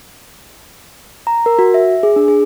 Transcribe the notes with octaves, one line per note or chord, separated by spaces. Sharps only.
A#5
A#4
F#4
E5
G#4
D4
G#4